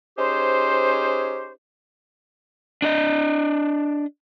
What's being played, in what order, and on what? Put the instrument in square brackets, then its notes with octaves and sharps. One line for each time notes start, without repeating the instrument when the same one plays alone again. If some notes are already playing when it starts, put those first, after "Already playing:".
[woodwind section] C#4 D#4 G4 G#4 C5
[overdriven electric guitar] D4 D#5